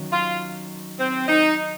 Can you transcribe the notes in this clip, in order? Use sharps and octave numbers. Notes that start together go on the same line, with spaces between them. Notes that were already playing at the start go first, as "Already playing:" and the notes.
Already playing: D#3 F#3 C#4
F4
C4
D#4